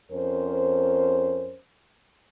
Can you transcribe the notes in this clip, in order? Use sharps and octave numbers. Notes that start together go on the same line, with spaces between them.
F2 C#4 A#4 C5